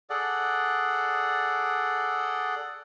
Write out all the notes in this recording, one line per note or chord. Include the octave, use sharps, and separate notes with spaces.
G#4 A4 D5 F#5